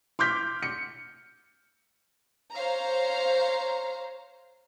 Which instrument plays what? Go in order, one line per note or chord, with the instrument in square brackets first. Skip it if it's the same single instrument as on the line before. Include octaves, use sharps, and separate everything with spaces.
[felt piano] C6 D6 F6 G6 B6
C#7
[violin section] C5 C#5 F5 A#5